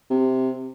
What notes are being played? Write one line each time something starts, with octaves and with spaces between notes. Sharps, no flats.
C3